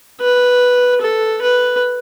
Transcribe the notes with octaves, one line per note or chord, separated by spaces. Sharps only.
B4
A4
B4